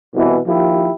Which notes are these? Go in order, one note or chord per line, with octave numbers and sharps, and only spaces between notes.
C2 B2 E3
D#2 F3 E4 G4